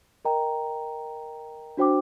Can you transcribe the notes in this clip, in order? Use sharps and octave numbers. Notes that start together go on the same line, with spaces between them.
A#4 D#5 G5 A#5
D4 F#4 C5 G5 D6